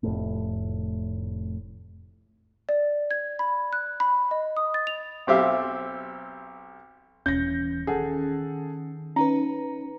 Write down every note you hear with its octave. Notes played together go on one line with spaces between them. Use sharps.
F1 A2
D5
G#6
B5
F#6
B5
D#5
D#6
A6
F7
B1 C4 G4 E5 F5
D#1 E3 C#4 G6 A#6
D#3 G#4 A4 F#5
C#4 D#4 B4 A#5